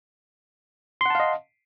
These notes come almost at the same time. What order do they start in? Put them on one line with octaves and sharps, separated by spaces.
C6 F#5 A5 F5 D#5